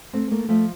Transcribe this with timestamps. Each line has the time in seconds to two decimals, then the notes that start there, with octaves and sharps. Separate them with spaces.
0.13 A3 C4
0.31 A3 A#3
0.49 F3 A3